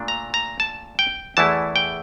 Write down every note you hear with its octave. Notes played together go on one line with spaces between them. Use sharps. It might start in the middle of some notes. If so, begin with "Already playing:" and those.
Already playing: A#2 A3 D4
A#5
A#5
A5
G5
E2 E3 A3 E4 A5
G5